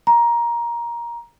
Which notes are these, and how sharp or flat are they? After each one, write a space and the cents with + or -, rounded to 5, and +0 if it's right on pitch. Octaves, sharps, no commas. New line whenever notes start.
A#5 +15